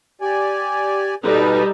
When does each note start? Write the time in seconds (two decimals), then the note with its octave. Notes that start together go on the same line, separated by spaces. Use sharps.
0.21 G4 D5 G#5
1.24 B2 G3 D#4 A4 B4